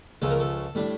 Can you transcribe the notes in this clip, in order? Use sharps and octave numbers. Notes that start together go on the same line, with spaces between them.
C#2 C#3 F3 A4
A#4
A4
A2 G3 D4